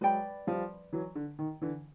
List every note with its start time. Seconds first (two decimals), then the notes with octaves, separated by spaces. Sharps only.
0.01 F#3 G#3 B4 D5 G5 B5
0.47 F3 G3
0.93 E3 F#3
1.15 D3
1.39 D#3
1.61 D3 E3